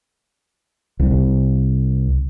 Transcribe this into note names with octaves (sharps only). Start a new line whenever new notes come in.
C2